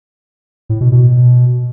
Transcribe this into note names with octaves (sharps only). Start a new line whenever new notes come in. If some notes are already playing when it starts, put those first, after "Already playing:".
A2
B2
B2